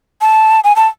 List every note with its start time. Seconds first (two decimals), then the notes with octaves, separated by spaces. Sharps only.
0.21 A5
0.64 G#5
0.76 A5